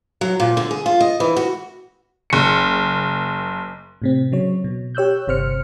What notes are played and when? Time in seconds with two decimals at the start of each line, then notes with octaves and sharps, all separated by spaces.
0.21 F#3
0.40 A#2
0.57 D3
0.71 G#4
0.86 F4
1.00 D#5
1.20 E3
1.37 F#4
2.30 F#1 C#7
4.02 A2 C3 C4
4.32 C#3 F#3 C#5
4.64 B2
4.95 G4 C#5 E6 F#6 G6
5.27 G1 C3 C5 F6 C#7